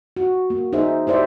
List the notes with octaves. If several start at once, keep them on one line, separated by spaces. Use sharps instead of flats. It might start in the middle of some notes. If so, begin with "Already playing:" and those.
F#4
A#3
D#4 G#4 C5 E5
E4 G4 C5 D5 E5